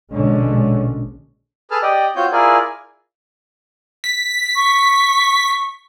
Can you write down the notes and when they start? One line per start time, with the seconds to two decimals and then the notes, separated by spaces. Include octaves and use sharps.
0.13 A#1 B2 D3 G#3 C#4
1.71 G#4 A4 B4 A5 F6
1.82 G4 D5 D#5 G5
2.16 C4 F4 F#4 C#5 G6
2.32 E4 F4 G#4 A#4 D5 G#5
4.04 B6
4.55 C#6